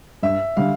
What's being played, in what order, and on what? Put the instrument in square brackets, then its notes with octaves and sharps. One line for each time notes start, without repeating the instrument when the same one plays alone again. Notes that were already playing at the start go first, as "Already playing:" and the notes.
[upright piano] G2 [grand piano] E5
[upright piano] D3 G3 [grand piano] F5